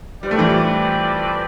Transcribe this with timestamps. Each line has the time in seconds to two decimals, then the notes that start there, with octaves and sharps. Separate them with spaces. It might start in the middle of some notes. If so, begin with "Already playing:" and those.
0.23 G3 C4 G4 B4 D5
0.31 A3
0.38 E3 G3